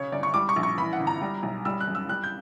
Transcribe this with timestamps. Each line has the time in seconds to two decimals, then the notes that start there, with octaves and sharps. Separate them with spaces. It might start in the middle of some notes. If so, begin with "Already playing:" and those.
Already playing: B1 C#3 C#5
0.12 G1 D5
0.23 C#6
0.34 G3 D6
0.49 C#6
0.56 A#1
0.63 C#6
0.78 E3 B5
0.93 F#5
1.00 G1
1.07 A#5
1.21 G3
1.43 B1
1.65 G3 E6
1.81 F#6
1.88 F#2
1.95 E6
2.09 G3 F#6
2.23 G6